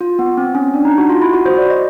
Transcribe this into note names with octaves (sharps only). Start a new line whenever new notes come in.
F4
B3
C4
C#4
D4
D#4
F#4
F4
E4
F#4
C5
D5
D#5